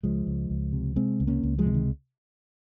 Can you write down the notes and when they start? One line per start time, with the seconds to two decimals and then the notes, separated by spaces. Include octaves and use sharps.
0.04 C#2 F3 G#3
0.27 C#2
0.50 C#2
0.73 C3
0.96 C3 G#3 C4
1.20 C#2
1.27 A#3 C#4
1.43 C#2
1.58 F3 G#3
1.67 C3
1.74 D#3